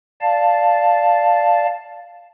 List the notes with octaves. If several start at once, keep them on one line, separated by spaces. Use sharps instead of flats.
D5 F5 A5